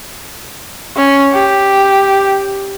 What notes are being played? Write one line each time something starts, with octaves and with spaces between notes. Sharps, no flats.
C#4
G4